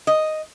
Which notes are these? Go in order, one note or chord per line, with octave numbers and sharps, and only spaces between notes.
D#5